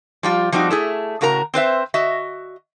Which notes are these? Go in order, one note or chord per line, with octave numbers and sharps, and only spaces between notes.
F3 G3 F4
F3 G3 C4 D#4 F#4
A3 E4 G#4
A2 C#3 F#4 A#4 A#5
C4 B4 C5 E5
F#4 D#5 E5